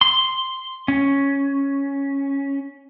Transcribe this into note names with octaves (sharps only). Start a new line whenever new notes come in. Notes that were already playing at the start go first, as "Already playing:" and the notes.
C6
C#4